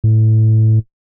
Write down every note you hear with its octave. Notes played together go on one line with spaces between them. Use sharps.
A2